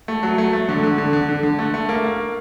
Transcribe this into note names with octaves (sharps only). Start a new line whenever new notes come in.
A3
F#3
A3
A3
D3
D3
D3
D3
D3
D3
A3
A3
A#3
A#3